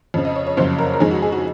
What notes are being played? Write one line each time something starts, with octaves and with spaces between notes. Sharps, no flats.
F2 C#3 F3
D#5
C#5
C#5
F#1 F2 C#3 F#3 C5
A#4
A#4
F2 D#3 G#3 D#4 G#4
F#4
G#4
F#4